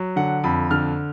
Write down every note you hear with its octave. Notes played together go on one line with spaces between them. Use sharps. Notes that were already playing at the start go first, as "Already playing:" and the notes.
Already playing: F#3
D3 F#5
F2 B5
D3 F6